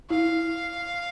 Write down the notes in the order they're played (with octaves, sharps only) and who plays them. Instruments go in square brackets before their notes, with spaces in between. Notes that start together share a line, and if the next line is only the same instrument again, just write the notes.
[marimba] E4 [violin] F5